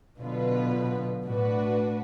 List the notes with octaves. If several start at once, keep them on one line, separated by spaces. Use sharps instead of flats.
B2 D3 F#3 B3 F4 B4
A2 A3 D4 F#4 B4